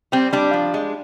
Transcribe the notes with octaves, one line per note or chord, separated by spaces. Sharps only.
G3 C4
G3 D4
F3
G#3